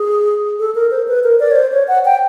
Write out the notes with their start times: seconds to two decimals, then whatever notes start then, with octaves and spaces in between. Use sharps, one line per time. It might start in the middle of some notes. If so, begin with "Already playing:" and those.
Already playing: G#4
0.60 A4
0.75 A#4
0.91 C5
1.08 B4
1.24 A#4
1.40 D5
1.51 C#5
1.56 C5
1.72 C#5
1.88 F#5
2.05 G5